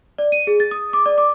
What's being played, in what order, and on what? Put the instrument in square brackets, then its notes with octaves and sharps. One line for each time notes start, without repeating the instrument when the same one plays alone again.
[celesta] D5
D#7
G#4
A6
D#6
D6
D5
D6